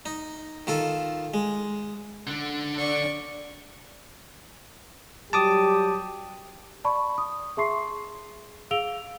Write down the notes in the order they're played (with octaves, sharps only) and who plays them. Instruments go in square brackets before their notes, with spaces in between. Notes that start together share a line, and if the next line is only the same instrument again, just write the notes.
[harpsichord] D#4
D#3 F4 A4
G#3
[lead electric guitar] D3 D4
[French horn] D5 [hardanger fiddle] C#6
[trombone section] F#3 G3 G4 [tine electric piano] A5 D6 D#6
[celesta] D5 A5 B5 C#6
D#6
G#4 E5 A5 C6 C#6 C7
G#4 F5 E6 D7 F7 G7